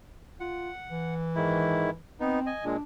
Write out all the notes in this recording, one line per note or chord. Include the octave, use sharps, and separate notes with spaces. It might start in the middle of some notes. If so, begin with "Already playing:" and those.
F4 F#5
E3
G#2 D#3 E4
B3 C4 D#4
D#5 G#5
A#2 G#3 D4